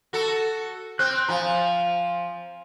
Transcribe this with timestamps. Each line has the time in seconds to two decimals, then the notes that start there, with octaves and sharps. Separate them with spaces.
0.13 F#4 A4
0.99 C4 F#6 G6
1.29 F3 F5 G#5 A#5